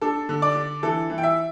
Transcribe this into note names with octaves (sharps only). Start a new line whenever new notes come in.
D4 A4
D3
D5
D4
E3 A4
E3
G5
E5